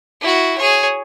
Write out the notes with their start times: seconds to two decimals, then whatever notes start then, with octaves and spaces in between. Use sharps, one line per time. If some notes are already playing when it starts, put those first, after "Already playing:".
0.21 E4 F#4
0.58 G#4 C#5